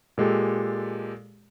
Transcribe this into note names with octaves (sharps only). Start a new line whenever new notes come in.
A#2 G#3 G4 A4